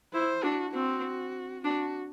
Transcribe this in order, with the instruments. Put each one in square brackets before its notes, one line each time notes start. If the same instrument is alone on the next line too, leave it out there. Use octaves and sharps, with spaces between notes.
[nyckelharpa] E4 [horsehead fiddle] C5
[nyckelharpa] D4 [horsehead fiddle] F#4
[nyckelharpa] C4 [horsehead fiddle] F#4
[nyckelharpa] D4 [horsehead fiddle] F#4